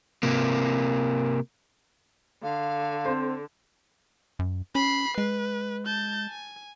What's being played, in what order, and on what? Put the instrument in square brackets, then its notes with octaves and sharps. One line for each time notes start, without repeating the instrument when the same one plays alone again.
[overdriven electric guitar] C3 A#3
[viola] D3 [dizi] F5
[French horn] C4 [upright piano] C5
[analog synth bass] F#2
[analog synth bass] C#4 [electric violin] B5 C7
[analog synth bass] G#3 [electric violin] B4
[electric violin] A5 G6
G#5